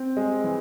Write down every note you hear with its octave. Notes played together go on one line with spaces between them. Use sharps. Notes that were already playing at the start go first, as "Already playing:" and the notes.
Already playing: C4
G#3
E3